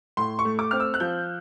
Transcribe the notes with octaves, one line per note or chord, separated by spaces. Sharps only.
A2 C6
C#6
A3
D6
C4 F6
E6
F#6
F3 G6